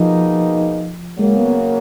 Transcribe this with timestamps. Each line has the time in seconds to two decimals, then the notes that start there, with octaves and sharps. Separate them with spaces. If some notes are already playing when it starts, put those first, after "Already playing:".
Already playing: B2 F3 A#3 D#4 G#4
1.19 C#3 F#3 G#3 A#3
1.37 B3